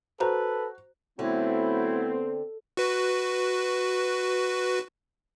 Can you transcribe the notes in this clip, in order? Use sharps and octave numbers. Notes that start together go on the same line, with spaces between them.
F#4 A4 B4 C5 A#5
D3 F#3 A3 B3 C4 E4
F#4 B4